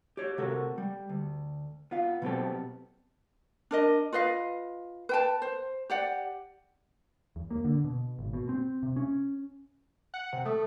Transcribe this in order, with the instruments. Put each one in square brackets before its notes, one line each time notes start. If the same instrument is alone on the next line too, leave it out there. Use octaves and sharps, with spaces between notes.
[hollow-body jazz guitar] G4 C#5
C3 A3 F#4 A4 A#4
G3
D2
B3 F4 F5
B2 F#3 B3 C4 G4 A4
[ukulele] D4 A#4 D#5
F4 B4 D#5 F5
B4 G5 A5
C5
G4 D5 F#5
[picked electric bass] E2
A#3
D3
B2
G#1
B2
C4
C3
C#4
[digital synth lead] F#5
C3
[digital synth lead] A3 [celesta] A4 D#6